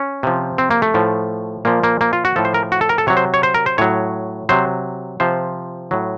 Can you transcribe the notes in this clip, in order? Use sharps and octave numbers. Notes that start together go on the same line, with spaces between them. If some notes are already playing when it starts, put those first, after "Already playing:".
Already playing: C#4
C3 F3
C4
A#3
A3
A2 F3
A#2 F3 A#3
A#3
A#3
F4
F#4
A2 F3 A4
C5
A#4
F#4
A4
A#4
A4
C3 F#3 C#5
C5
C#5
C5
A#4
C5
A2 F#3 C#5
C3 F#3 C5
C3 F3 C5
A2 F#3